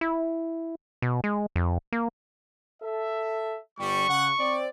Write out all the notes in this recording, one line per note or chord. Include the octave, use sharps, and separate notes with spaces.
E4
B2
G#3
F2
A#3
A4 E5
G1 G3 C#6
C#3 F#5
C4 D5